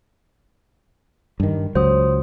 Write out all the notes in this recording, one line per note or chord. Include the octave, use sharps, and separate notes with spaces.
G2 D#3
C#2 F#3 C5 D#6